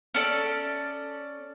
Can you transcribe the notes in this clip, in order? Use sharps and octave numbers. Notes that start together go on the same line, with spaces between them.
C#4 A4 D5